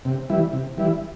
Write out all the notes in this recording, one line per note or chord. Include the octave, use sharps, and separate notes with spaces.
C3
E3 G3 E4
C3
E3 G3 E4